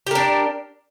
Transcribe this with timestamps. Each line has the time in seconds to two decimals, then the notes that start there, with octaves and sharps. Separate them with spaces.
0.07 G4
0.11 A#4
0.15 D4